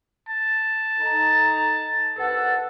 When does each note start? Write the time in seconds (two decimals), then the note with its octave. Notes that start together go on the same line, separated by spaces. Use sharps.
0.29 A5
0.99 D#4 A4 A#5
2.18 C2 A4 B4 F#5